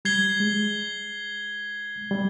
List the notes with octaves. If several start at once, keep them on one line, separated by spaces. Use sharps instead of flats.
G3 G#6 C7 G7
G#3
G3